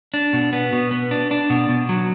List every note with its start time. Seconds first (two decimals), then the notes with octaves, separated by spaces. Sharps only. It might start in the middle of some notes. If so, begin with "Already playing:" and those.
0.14 D4
0.33 B2
0.53 B3
0.73 B2
0.91 B3
1.11 D4
1.31 D4
1.50 B2
1.69 B2
1.89 F#3